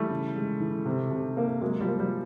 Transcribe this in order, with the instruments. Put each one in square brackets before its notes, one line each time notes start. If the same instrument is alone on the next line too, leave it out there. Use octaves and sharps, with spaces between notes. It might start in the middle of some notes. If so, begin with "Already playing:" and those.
Already playing: [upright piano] E3 [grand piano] G3 A3
[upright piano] C#3
G#3
E3
C3
C3
A#3
[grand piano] F#3 G#3 [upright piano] A#3
[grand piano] F3 G3
[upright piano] A#3
[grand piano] F3 G3